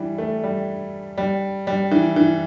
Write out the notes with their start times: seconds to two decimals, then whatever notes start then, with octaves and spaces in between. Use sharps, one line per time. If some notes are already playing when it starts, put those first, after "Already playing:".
Already playing: E3 G3
0.18 A3
0.43 G3
1.18 G3
1.67 G3
1.92 E3
2.16 E3